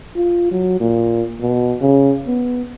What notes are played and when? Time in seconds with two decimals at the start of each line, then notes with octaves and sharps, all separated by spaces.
0.16 F4
0.51 F#3
0.80 A#2
1.41 B2
1.81 C#3
2.27 B3